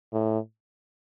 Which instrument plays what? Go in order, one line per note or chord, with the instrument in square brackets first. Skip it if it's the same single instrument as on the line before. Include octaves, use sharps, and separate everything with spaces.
[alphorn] A2